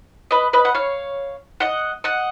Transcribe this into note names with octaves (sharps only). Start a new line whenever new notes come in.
B4 D#5
B4 D#5
F#5
C#5 F5
D#5 F#5
D#5 F#5